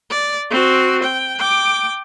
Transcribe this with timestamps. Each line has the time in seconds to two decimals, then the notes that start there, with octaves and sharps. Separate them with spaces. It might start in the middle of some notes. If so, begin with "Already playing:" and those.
0.10 D5
0.51 C4 F#4
1.03 G5
1.39 G5 D6